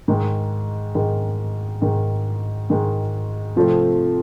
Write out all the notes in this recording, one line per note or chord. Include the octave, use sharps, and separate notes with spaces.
G#2 D#3 G#3
G#2 D#3 G#3
G#2 D#3 G#3
G#2 D#3 G#3
C3 F3 A3 C4